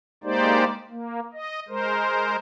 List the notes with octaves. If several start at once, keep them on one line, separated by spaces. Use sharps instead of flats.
G#3 A#3 D#4 G4 C5 D5
A#3
D#5
G#3 A#4 C5